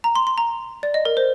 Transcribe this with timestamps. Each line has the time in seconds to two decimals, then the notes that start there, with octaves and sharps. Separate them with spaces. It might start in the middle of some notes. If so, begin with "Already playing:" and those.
0.04 A#5
0.16 C6
0.27 C6
0.38 A#5
0.83 D5
0.94 D#5
1.05 A#4
1.17 C5